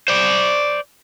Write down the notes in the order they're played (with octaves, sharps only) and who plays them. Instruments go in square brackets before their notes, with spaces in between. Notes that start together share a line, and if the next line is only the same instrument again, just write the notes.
[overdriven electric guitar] C5 D5